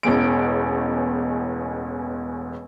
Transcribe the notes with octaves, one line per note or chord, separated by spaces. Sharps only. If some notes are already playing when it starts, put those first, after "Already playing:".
E1 A1 E2 D7